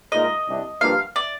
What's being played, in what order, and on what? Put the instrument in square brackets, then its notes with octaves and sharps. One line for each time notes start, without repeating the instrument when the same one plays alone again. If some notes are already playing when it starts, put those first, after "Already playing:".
[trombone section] A#2 G#3 D#4 A#4 [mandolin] D#5
[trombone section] C2 C3 G3 D4
[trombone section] G2 F3 A#3 D4 F4 [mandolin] F5
[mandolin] D5